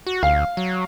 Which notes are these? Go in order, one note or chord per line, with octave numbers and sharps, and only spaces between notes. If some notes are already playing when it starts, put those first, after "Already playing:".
F#4
D2 F5
F#3